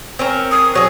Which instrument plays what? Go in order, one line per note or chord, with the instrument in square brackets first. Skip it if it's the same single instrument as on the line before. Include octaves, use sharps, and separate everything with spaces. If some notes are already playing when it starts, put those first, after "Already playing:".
[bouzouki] C4 C#4 A#4
[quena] D#6
[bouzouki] F#3 G#4